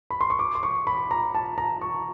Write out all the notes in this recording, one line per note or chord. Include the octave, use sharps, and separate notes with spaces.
B5
C6
C#6
D6
C6
C#6
B5
A#5
A5
A#5
C#6